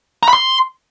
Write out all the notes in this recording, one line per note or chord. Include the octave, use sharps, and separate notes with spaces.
A#5
B5
C6